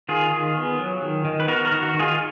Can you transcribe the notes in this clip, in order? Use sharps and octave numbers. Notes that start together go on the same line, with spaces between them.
D#3 F4 G#4
D#3
B3
F#3
D#3
D#3
B4
B3 F#4 A#4
F#4 A#4
D#3
F#4
D#3
F4 G#4